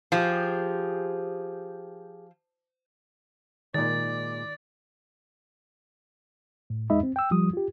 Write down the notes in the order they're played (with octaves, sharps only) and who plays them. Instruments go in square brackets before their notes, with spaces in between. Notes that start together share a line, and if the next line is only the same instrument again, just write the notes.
[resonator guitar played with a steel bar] F3 [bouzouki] G4 G#4 C5
[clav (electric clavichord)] A#2 G#3 [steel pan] D#3 [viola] D5 [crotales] A6
[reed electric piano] A2
E2 G#3 D#4 D#5 E5 B5
C4
G5 E6
F3 G3 D#6
F4 G4